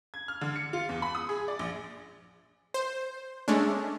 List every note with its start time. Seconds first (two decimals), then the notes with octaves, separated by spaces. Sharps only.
0.14 G#6
0.28 F6
0.41 D3
0.56 C#7
0.73 F4
0.89 E2
1.02 B5
1.15 D#6
1.29 G#4
1.48 D5
1.59 A#1
2.74 C5
3.48 G#3 A3 C#4 D4